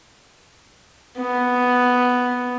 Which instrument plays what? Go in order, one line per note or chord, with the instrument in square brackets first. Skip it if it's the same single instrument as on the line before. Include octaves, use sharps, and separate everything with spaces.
[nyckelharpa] B3